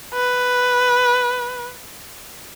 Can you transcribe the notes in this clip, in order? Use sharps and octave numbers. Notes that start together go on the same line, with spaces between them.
B4